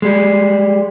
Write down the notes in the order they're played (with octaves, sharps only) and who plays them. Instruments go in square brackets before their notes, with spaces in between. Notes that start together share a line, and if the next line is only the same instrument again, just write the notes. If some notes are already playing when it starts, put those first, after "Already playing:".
[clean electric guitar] G3 G#3